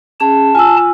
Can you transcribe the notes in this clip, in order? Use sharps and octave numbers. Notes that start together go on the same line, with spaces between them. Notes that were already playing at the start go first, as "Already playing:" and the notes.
C#4 G#4 A5
F4 G#5 E6